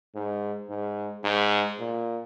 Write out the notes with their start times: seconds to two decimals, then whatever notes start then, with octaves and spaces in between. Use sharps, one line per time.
0.15 G#2
0.70 G#2
1.24 G#2
1.79 A#2